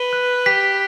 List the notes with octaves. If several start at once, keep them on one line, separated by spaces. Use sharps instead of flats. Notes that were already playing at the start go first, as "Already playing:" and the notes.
Already playing: B4 G7
F#6
G4 B6